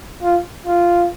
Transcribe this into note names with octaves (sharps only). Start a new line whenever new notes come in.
F4
F4